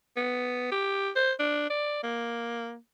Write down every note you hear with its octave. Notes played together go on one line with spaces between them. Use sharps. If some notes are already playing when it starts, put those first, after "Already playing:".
B3
G4
C5
D4
D5
A#3